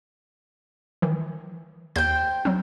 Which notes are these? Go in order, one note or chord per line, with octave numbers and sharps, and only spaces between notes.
D#3 E3
D#2 C5 G5 G6
F#3 C4